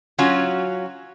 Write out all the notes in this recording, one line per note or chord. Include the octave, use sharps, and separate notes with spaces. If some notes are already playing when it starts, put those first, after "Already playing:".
F#3 C#4 F4 F#4